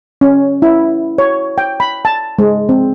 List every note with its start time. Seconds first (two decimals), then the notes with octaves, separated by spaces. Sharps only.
0.21 C#4
0.62 E4
1.18 C#5
1.58 G5
1.80 B5
2.05 A5
2.39 G#3
2.69 C4